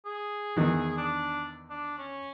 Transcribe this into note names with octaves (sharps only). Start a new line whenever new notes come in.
G#4
E2 D#3 E3
D4
D4
C#4